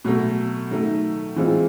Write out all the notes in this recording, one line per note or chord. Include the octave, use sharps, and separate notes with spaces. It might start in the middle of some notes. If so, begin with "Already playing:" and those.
B2 F#3 A3
D#3 F#3 A3
E3 G#3 C4 F4